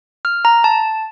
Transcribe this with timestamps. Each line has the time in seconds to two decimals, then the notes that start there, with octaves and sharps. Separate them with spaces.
0.25 F6
0.45 A#5
0.64 A5